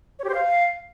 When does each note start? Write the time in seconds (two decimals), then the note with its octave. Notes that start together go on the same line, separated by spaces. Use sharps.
0.19 C#5
0.24 G4
0.29 C5
0.34 F5